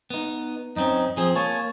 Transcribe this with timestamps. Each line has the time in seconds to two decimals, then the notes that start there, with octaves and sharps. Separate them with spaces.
0.10 B3 D#4
0.76 F#2 C4 C#4 D#4
1.17 F3 C4 G#4
1.35 A#3 C#5 G#5 A5